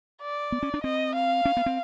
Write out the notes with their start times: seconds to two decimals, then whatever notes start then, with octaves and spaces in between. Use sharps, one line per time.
0.21 D5
0.52 B3
0.63 C#4
0.74 D4
0.84 C4 D#5
1.15 F5
1.45 C#4
1.57 B3
1.66 C4